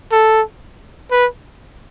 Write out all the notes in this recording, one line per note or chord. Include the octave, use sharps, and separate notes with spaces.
A4
B4